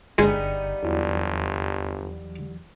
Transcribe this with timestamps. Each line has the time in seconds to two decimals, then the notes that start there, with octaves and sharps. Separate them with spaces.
0.18 G1 D3 G3 G#3 B3 D#4 G#5 C#7
0.83 G1 E2 E3 F#3